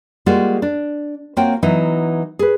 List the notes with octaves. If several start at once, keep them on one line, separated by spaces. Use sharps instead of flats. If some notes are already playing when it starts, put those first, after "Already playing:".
G3 G#3 A#3 F4 F#4
D4
A#3 C4 F4 F#4 C#5 G5
E3 F#3 B3 D#4 E4
G#4 B4